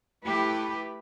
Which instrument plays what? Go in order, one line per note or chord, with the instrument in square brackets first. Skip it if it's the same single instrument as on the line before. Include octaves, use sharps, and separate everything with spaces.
[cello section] A3 E4 G4 B4